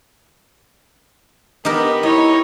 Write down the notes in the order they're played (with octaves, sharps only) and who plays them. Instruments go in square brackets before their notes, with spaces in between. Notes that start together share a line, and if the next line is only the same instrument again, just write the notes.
[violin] B3 [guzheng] D#4 G4 A#4
[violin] D#4 C#5 [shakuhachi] E4 [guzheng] D#5